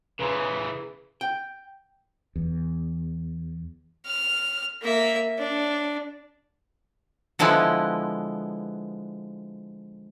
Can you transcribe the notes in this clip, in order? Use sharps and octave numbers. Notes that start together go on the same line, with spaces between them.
C#3 E3 G#4 B4 A#5 C6
G5
E2
F6
A#3 E5
D4
D3 F3 G#3 B3 E4 B4